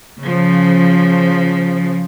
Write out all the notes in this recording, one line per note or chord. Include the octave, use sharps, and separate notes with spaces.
C#3 F3